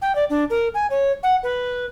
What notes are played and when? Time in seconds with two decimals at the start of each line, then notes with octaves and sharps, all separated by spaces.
0.02 G5
0.15 D5
0.30 D4
0.50 A#4
0.74 G#5
0.90 C#5
1.23 F#5
1.43 B4